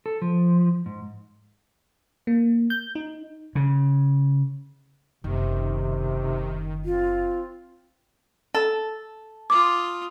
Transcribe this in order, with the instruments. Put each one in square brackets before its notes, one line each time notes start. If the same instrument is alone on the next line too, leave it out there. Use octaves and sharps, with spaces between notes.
[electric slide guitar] A4
F3
G#2
[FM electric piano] A#3
G6
D#4
[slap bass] C#3
[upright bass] F#1 [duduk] C3 [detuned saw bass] D#3
[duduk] C4 [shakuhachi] F4
[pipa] A4
[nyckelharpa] F4 D#6 [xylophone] D6